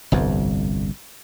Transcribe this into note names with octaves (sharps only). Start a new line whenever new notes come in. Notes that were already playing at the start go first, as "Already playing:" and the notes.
G1 C2 F2